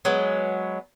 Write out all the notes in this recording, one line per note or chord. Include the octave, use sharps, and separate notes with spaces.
F#3 G#3 B3